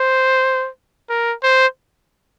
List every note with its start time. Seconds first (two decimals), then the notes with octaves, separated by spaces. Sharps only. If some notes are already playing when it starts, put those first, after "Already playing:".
Already playing: C5
1.09 A#4
1.43 C5